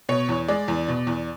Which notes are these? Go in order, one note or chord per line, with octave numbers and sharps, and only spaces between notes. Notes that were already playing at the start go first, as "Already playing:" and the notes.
B2 C#5
E2
G#3 D5
E2
B2
E2